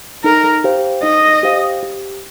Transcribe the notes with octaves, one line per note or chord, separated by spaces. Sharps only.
D#4 A#4
G4 C5 F5
D#4 D#5
G4 C5 F5
G4